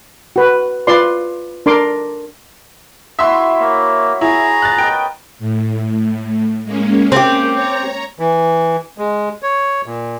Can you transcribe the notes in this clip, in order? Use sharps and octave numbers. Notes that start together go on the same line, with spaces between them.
F#4 B4
F4 B4 D5 C6
D4 A#4 C6 D6
E4 F#4 E5 C6
A#3 C#5
E4 G#4 A#5
F#6 A6
A#4 B4 D#5 G5
A2
G#3 A#3 C#4
A#3 C4 C#4 G4
C#5 A#5
E3
G#3
C#5
A#2